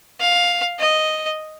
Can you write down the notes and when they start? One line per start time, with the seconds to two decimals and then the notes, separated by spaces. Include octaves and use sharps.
0.20 F5
0.79 D#5